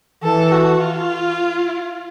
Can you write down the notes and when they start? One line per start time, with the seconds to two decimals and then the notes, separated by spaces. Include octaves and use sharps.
0.22 E3 A4
0.52 F#4
0.81 F4